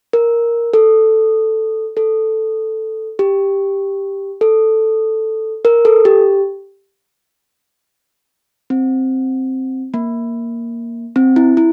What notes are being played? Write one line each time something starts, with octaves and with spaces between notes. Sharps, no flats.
A#4
A4
A4
G4
A4
A#4
A4
G4
C4
A#3
C4
E4
E4